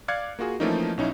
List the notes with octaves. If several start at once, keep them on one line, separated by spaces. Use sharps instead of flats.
D5 F5 D6 F#6 G#6 C#7
A#3 F4 F#4 G#4
E3 F3 A3 A#3 C#4 D#4
B1 C#4 D#4 E4